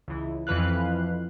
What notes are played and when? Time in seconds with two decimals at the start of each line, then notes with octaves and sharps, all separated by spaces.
0.08 C#2 E3
0.47 F2 E3 B4 F5 F#6